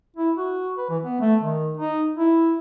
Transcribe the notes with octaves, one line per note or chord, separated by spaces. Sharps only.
E4
F#4
B4
E3
B3
A3
D#3
D#4
E4